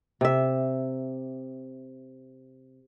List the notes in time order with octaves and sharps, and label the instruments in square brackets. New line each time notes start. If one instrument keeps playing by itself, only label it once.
[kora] C3 E5